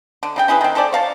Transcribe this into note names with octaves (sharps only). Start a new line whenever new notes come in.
D3
C#3 D#4 G5
C#4 E4 G#4 B4
D#3 C4
C#4 A4 C5 D5
C#5 F5 A5